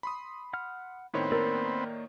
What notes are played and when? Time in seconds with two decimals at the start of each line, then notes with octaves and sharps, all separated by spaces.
0.03 B5 C6 D#6
0.53 F#5 F6
1.14 A2 D#3 B3 C4 C#5
1.32 A#3 A#4 D5 E6